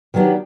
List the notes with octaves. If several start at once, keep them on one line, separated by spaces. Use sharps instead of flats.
D#3 F#3 B3 D4 G4